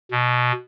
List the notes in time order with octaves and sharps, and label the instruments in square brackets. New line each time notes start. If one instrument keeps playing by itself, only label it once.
[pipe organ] B2